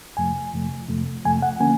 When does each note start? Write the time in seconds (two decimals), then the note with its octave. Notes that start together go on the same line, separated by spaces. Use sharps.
0.17 F2 C3 F3 A3 G#5
0.54 F2 C3 F3 A3
0.89 F2 C3 F3 A3
1.25 F2 C3 F3 A3 G#5
1.42 F#5
1.60 D3 F3 A#3 C#4 G#5